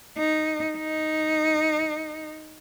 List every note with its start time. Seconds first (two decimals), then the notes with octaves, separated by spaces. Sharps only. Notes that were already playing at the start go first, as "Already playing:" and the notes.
0.18 D#4
0.78 D#4